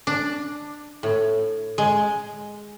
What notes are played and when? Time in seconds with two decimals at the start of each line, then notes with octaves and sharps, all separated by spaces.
0.07 D4
1.03 A2
1.78 G#3